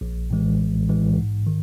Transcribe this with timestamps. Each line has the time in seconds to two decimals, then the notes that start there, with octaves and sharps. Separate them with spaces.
0.01 A#1
0.31 A2 E3 G#3
0.59 A#1
0.89 A2 E3 G#3
1.18 G#2
1.47 D#3